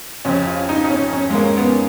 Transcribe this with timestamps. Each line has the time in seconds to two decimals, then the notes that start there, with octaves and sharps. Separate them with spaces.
0.25 F1 F2 C#3 C#4
0.47 F4
0.69 D#4
0.84 D#4
0.91 C#4
1.13 C#4
1.30 G#3
1.35 A#3
1.57 B3